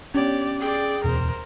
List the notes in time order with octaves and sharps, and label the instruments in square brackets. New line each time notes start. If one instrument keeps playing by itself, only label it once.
[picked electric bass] B3 D4 [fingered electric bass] C#4 [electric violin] G4 D5 [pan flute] C#5
[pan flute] G#4 [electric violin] D5 G5
[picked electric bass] D1 E2 B2 [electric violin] A#4 C5